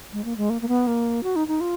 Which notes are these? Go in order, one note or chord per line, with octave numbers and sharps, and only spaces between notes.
G#3
A#3
G#3
A#3
A#3
B3
A#3
F#4
D#4
D#4
F4